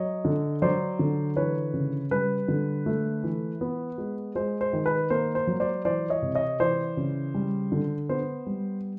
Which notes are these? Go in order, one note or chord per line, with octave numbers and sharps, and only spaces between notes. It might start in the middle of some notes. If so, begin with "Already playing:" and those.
Already playing: F#3 C#5 D#5
D3
F#3 C5 D5
D3
E3 B4 C#5
C#3
G3 B4
D3
A3
E3
B3
G#3
G#3 C5
C5
D#3
B4
A#3 C5
C5
F#3
C5 D5
E3 C5 D5
C#5 D#5
C3
C#5 D#5
E3 C5 D5
C#3
G3
D3
B3 C5
G3